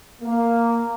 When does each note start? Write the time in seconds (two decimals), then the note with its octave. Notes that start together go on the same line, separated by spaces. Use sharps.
0.21 A#3